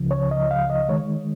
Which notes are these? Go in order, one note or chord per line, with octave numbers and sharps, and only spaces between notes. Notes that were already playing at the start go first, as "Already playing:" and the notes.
Already playing: C#2 C#3 F3
C#5
D#5
F5
D#5
D#3 G#3 C#5